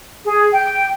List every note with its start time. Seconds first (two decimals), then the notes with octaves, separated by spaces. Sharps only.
0.24 G#4
0.52 G5